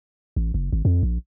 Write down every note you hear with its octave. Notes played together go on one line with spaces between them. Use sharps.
A1
F#1
G#1
F2
A#1